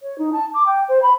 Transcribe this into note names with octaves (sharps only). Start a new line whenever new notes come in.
C#5
D#4
A5
D6
G5
C5
B5